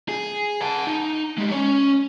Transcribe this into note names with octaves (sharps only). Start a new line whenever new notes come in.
G#4
F#5 A5
D#4
G3 G#3
C#4 C#5